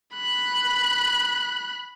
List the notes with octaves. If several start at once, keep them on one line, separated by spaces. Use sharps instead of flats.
B5 F#6